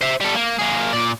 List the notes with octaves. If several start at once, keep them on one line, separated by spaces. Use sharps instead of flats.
C5 E5
G3 A4
A#3
A#3 G#4
A#2 D5